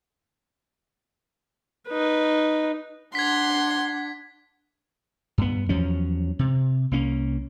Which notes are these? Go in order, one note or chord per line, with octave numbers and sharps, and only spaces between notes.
D#4 B4
D4 F#5 C6 G#6 B6
G2 B3
E2 F3 F#3 C#4
C3
C2 A#3 C#4